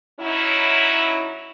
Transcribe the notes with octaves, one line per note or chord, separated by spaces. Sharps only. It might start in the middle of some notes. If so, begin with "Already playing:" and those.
F#3 C#4 D#4 E4